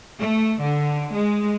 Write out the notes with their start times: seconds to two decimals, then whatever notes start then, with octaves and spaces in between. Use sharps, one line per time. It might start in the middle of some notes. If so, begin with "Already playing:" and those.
0.19 A3
0.62 D3
1.13 G#3